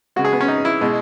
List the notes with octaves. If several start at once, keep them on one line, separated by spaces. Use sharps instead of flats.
C#3 G#3 F#4
G#4
B3
C#4
D#4
E4
B2 G#3